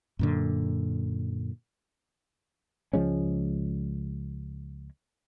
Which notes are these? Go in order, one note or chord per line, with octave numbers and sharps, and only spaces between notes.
F#2 A#2 D3
C#2 F3 G#3 C#4